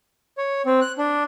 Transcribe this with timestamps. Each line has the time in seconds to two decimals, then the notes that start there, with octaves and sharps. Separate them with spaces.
0.38 C#5
0.66 C4
0.81 F#6
0.98 D4